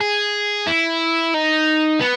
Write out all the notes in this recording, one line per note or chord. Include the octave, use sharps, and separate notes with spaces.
G#4
E4
D#4
B3